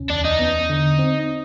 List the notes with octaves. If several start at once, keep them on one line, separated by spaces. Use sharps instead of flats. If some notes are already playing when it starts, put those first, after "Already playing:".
Already playing: D2 C3 C#4
E2 D4
D#4
B3
D3
C4